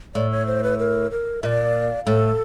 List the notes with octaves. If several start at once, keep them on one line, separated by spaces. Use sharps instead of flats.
A2 D5
C#5
C5
B4
A#4
A#4
A#2 D5 E5
A2 A4